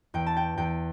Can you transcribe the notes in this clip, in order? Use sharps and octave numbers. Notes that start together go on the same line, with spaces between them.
E2 G5
A5
G5
E2 G5